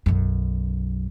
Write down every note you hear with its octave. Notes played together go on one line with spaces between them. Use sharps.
B1 F#2